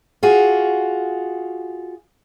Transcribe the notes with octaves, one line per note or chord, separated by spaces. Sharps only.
F4 F#4 G#4